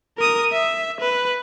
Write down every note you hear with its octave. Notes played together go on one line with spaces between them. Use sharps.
A#4 D#6
E5
B4